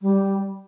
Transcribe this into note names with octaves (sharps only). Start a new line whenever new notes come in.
G3